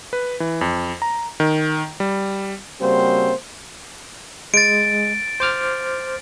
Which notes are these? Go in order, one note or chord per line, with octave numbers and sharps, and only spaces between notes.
B4
E3
F2
A#5
D#3
G3
C#3 G3 A#3 C4 F#4 C5
G#3 A6 D7
C5 D6 F6